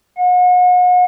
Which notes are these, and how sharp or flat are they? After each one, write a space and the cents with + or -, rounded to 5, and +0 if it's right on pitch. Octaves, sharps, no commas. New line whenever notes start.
F#5 -40